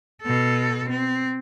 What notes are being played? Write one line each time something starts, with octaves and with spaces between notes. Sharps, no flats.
B2 A4
C4